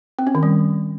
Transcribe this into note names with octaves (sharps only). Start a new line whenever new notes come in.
C4
C#4
D#3
G3